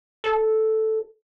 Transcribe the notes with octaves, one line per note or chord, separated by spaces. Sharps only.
A4